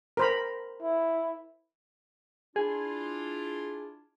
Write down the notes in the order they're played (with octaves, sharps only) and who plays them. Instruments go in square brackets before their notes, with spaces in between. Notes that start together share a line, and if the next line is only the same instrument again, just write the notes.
[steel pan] A#4 C5 B5
[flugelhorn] E4
[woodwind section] D4 E4 F4 [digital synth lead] G#4